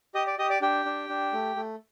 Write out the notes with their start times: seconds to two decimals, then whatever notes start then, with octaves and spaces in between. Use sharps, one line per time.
0.14 G4 D#5 D#6
0.27 D5 D6
0.38 G4 D#5 D#6
0.50 D5 D6
0.61 D4 G4 G5
0.85 D4
1.09 D4
1.33 A3
1.56 A3